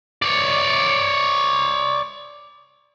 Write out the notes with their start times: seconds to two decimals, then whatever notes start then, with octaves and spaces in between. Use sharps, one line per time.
0.22 C#5 D5